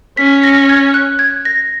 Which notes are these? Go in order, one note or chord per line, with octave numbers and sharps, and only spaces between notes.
C#4 B6
A#6
G#6
F#6
G#6
A#6